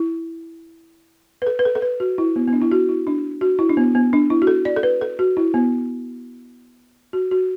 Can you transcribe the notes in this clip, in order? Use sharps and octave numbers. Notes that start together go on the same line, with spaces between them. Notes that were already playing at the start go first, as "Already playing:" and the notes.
Already playing: E4
B4
A4
B4
A4
A4
B4
F#4
E4
B3
B3
D4
E4
F#4
E4
D4
F#4
E4
D4
B3
B3
D4
E4
F#4
A4
D5
A4
B4
A4
F#4
E4
B3
F#4
F#4